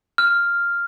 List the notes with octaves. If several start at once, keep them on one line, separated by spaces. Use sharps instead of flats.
F6